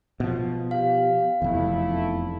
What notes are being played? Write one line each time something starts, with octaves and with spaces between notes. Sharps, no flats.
B2 F3
G4 F5
F1 E2 A3 E4